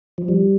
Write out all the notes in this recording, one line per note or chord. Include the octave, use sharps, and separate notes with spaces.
F3
G3